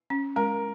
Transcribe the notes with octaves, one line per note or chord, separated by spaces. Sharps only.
C#4
G#3 A#4